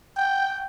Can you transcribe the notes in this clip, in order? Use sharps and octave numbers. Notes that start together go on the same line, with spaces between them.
G5